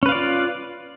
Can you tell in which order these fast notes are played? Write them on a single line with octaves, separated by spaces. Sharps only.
C#4 B4 F5 D5 F4